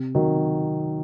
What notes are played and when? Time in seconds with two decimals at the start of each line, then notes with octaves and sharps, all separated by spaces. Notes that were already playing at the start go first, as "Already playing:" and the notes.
Already playing: C3
0.15 D#3 F#3